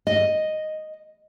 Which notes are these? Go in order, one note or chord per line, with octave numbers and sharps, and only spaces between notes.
D#5